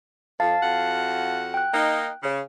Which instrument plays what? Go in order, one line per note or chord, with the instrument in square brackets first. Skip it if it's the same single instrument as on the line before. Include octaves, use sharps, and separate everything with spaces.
[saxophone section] F2 [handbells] F5 A5 A6
[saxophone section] F2 F#4 F#5
[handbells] G5 F#6
[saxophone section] A#3 D#4
C#3